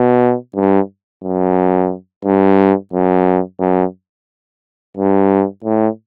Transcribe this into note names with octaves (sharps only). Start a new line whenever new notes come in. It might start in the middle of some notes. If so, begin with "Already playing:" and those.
Already playing: B2
G2
F#2
G2
F#2
F#2
G2
A2